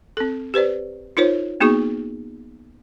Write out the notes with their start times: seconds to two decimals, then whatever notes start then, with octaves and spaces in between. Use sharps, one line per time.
0.17 C4 A4
0.54 G4 B4 C5 D5
1.17 D#4 F4 A#4 C5 C#5
1.60 A#3 B3 D#4 F#4 G#4 C#6